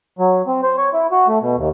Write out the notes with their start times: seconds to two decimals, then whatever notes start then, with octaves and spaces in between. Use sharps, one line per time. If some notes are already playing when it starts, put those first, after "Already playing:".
0.19 F#3
0.47 C4
0.63 C5
0.78 C#5
0.93 E4
1.12 F#4
1.28 A3
1.42 B2
1.57 D#2